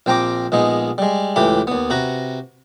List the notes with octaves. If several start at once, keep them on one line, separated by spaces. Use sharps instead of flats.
A#1 C4 G5 A#5 D6
A#1 G#3 B3 D#4
G3 G#3
C#2 A2 E3 G4 B5
D#2 B3
C3 F#4 B4 A#5